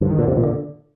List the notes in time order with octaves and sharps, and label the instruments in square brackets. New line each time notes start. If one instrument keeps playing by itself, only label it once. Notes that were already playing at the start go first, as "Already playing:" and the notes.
[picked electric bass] G2 [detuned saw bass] D3
[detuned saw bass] D#3
[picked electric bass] A#2 [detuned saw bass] D3
[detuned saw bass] F2 [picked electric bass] C3
[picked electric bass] A#2
D3